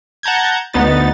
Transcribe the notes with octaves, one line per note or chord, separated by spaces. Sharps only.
F#5 A5 A#5 G6 G#6
D2 B3 D#4 A6